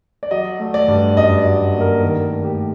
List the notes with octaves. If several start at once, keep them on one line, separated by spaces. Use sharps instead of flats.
D5
F#3 D#5
A3
D5
G2
F#2 D#5
D5
F#3
A#3
A#4
D#3 A#4
A3
G4